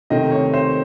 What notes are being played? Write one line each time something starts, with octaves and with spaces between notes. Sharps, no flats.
C3 D#3 A3 C4 D#5
C#5
C5